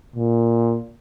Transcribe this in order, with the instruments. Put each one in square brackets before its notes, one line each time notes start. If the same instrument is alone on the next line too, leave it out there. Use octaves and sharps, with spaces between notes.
[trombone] A#2